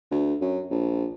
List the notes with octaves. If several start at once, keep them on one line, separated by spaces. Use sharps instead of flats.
D2
F#2
A#1